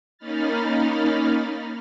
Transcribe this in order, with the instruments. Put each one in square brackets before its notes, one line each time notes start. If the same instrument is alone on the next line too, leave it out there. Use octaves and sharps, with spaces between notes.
[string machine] A#3 C#4 D#4 B5 F6 A6